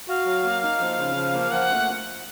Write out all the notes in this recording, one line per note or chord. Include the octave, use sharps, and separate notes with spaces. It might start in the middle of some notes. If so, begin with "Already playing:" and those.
F#4 F5
F#3
A#3
D#4
F3
C#3
F3
A#3
F3 F#5
A3